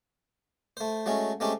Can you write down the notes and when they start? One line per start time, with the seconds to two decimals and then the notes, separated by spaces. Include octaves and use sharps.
0.77 A3 C5
1.06 F#3 G#3 A3 C#4
1.40 G#3 A3 C4 C#4 G4